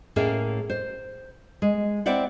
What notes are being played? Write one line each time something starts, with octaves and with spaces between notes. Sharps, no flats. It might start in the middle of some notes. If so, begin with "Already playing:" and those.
A2 A#3 C#4 G#4 A#4 E5
C5
G#3
C4 E4 C5 D5 E5 F#5